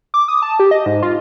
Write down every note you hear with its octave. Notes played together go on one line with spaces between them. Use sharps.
D6
D#6
A5
G4
D#5
G#2
F4